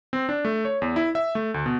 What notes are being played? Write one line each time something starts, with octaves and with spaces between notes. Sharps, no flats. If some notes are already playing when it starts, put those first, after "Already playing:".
C4
D4
A3
C#5
E2
E4
E5
A3
D2
B2